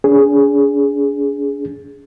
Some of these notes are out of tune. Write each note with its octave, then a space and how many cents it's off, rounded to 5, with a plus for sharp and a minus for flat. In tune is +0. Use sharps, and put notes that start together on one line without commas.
D4 -45 G#4 +0